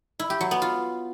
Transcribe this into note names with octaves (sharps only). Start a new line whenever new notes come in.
E4
G4
F#3
B3
F4